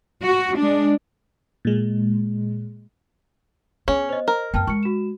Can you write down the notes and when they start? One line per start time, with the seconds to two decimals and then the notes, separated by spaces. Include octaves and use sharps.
0.22 F#4
0.57 G#3 D4
1.65 A#2 G#3
3.88 B3 C#4 G#4
4.09 C5 D#5
4.28 A#4
4.54 F#2 B3 G5 A5 F6
4.67 G#3 C#6 C#7
4.83 F#4 E7